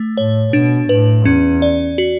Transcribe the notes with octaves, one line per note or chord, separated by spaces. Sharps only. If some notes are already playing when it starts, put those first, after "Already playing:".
Already playing: A3
A2 C#5
B2 D4
A2 B4
E2 C#4
D5
F#4